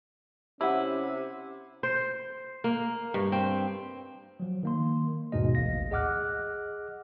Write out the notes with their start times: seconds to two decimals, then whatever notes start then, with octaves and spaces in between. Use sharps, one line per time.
0.61 C3 C#4 E4 G4 F#5
1.83 C5
2.64 A#3
3.14 G2
3.32 C4
4.40 F3 F#3
4.63 D#3 A#3 C6
5.32 D#2 G#2 B2 G#3 D#5
5.55 A1 D2 F5 A#6
5.91 G#4 D#5 F#5 D6 F6 F#6